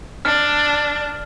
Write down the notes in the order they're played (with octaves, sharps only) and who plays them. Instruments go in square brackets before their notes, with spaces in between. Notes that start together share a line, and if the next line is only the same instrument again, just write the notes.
[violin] D4 [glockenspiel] F6